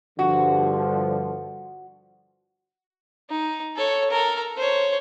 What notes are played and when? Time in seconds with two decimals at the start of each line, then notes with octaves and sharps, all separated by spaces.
0.19 G2 D3 F3 F#4
3.30 D#4
3.77 A4 C#5
4.11 A4 A#4
4.57 C5 C#5